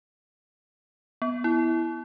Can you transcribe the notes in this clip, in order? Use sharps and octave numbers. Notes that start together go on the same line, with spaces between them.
B3
E4